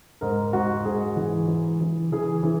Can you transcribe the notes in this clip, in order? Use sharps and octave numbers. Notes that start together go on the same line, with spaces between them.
G#2 A#4
G#2 F#4
G#2 G#4
E3
E3
E3
E3 G#4
E3 E4